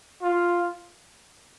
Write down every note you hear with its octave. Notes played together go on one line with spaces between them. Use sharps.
F4